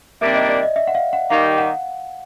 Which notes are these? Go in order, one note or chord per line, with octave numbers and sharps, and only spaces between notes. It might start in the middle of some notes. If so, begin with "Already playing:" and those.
C3 D#3 G3 A#3 D4 E5
D#5
D5
D#5
E5
F#5
F5
F#5
D#3 G3 A#3 D#4 G4 F5
F#5